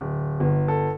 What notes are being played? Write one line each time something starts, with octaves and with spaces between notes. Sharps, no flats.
D1
G1
A4